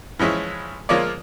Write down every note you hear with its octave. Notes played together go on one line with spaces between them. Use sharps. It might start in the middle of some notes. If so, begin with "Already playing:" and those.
E3 F3 G#3 C#4 E4
F3 G#3 A#3 F4 C#5 D5